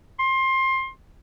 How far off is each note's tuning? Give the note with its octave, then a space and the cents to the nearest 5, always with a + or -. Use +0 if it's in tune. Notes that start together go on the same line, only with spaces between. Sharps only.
C6 +25